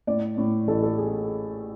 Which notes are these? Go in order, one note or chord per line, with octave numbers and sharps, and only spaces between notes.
A2 D5
A2
A1 A4
A4
G#4